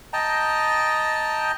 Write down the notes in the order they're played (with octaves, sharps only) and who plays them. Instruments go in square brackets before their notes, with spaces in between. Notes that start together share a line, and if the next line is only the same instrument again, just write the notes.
[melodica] D#5 G5 A5 A#5